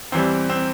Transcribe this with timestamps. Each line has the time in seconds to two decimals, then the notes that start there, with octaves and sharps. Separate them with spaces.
0.12 E2 E3 G3 C4
0.50 C4